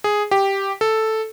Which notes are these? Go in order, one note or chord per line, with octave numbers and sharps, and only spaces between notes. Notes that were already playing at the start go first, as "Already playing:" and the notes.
G#4
G4
A4